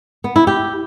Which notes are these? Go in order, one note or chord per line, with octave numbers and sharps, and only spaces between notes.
B3
E4
G4